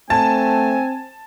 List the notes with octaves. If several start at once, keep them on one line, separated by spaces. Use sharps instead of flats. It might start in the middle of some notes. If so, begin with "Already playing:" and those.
A3 C4 G#5 A5